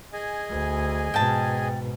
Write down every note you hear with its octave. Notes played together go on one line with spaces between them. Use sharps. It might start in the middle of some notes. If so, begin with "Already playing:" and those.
G#4 D#5 G#5
D2
G#2 B2 G5 A5